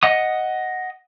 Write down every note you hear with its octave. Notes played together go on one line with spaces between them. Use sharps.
D#5 F#5 D#6